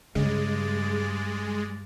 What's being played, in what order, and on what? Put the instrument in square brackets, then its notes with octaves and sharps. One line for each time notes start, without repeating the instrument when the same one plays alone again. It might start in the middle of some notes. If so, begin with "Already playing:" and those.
[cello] G2 D5 [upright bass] C#3 [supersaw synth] G#3